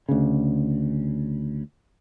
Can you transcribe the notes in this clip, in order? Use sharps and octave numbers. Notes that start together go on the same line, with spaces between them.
D2 C#3